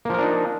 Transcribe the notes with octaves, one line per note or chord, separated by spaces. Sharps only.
F3 A#3 D4 D#4 A#4